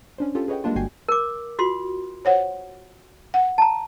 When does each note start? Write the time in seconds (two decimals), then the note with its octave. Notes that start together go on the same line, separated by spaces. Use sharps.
0.18 C#4 D4 C5
0.35 C#4 F4 G4 A4
0.48 G#4 B4 C#5 D#5 F#5 G5
0.64 G3 G#3 A#3 D4 F4
0.76 G1 F#4 G5 G#5 C7
1.08 A#4 D6
1.59 F4 F#4 C6
2.25 C5 C#5 F#5
3.34 F#5
3.58 A5 A#5